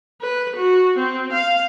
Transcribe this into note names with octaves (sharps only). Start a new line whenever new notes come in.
B4
F#4
C4
F5